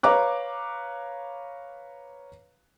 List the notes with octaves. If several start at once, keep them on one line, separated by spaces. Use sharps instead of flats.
B4 C#5 F5 A#5 D6 F#6